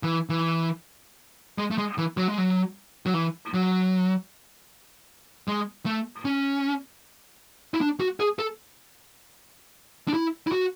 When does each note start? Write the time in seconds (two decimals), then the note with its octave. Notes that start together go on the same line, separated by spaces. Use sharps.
0.03 E3
0.29 E3
1.58 G#3
1.71 A3
1.78 G#3
1.98 E3
2.17 F#3
2.28 G#3
2.38 F#3
3.06 F#3
3.14 E3
3.54 F#3
5.48 G#3
5.86 A3
6.25 C#4
7.74 E4
7.81 D4
8.00 F#4
8.20 G#4
8.39 A4
10.08 D4
10.14 E4
10.47 E4
10.52 F#4